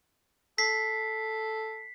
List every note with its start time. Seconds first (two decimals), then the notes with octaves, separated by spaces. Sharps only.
0.58 A4 B6 C7